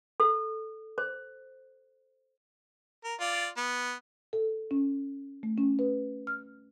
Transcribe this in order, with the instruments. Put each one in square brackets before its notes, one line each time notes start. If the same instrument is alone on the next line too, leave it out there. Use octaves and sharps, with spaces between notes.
[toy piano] A4
C5
[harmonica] A#4
F4 D5
B3
[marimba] A4
C#4
A3
C#4
B4
F6